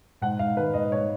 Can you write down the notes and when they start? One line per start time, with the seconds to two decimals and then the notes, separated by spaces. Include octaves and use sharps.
0.21 G#2 F#5
0.39 G#2 F5
0.56 D#3 B4
0.74 G#2 D#5
0.91 G#2 C#5